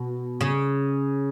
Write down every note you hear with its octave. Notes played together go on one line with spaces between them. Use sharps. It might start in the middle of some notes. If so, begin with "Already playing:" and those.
Already playing: B2
C#3